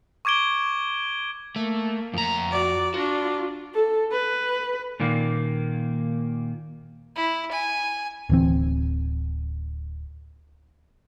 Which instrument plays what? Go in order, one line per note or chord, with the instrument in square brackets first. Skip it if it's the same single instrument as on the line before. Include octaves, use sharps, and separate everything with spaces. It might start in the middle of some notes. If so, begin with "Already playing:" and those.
[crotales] C#6 D6 G#6 D7 G7
[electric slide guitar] A3 [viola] A#3
[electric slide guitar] F2 A#5
[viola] F#4 D5
[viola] D4 F4 [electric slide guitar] F#4
[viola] A4
B4
[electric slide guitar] A#2 D#3 A#3
[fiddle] E4
G#5
[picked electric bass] D1 E3 C4